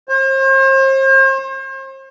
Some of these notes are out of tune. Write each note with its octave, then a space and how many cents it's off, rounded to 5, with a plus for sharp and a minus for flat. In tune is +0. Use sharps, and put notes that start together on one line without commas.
C5 +40